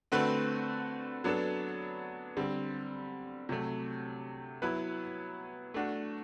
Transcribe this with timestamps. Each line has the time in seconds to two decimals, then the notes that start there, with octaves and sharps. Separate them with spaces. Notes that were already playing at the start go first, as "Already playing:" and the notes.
0.12 D3 A3 C4 F#4 B4
1.24 F#3 B3 D4 A4
2.37 D3 G3 C4
3.49 C3 F#3 A3
4.62 F#3 B3 E4 B4
5.74 A3 D4 F#4